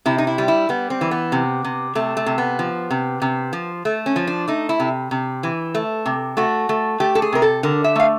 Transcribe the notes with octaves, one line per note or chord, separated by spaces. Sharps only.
C3 E4
D#4
E4
G3
E4
G3 B3
C4
E3
B3
C3
C3
C3 A3
A3
C3
B3
F3
C3
C3
F3
A3
C#4
F3
D4
A3 D#4
E4
C3
C3
E3
A3
C3
A3 F#4
A3
A3 G4
A4
G#4
C3 A#4
A4
D3 A#4
E5
A3 F5